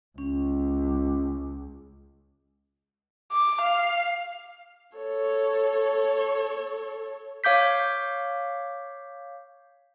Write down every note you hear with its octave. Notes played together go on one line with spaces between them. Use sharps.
C#2 C#4
D6
F5
A4 C#5
C#5 F5 D6 G6 B6